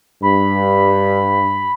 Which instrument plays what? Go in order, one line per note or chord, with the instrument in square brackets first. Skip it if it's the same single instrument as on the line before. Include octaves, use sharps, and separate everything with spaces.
[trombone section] G2 [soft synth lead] B5